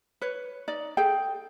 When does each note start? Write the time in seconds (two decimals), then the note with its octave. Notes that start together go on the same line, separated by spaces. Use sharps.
0.22 B4 C#5
0.68 D#4 D5
0.97 G#4 A4 G5